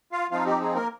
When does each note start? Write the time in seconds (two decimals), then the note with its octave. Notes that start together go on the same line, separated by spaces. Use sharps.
0.12 F4 F5
0.31 F3 C4 D#4 F4 F5
0.46 G4
0.61 G#4
0.75 A#3 A#4